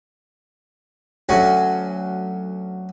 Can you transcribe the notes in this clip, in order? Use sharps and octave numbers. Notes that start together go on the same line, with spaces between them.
D2 F#3 C#4 F#4 G#5